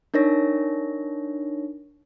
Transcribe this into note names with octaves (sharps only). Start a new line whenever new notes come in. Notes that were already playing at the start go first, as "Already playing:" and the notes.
D4 D#4 A#4 C#5 A#6